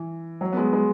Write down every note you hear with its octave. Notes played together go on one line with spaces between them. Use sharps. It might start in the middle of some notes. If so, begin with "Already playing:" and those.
Already playing: E3
F#3
B3
G#3
G#3